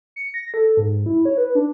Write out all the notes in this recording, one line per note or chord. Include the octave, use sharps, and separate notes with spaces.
C#7
A#6
A4
G#2
E4
C#5
B4
D4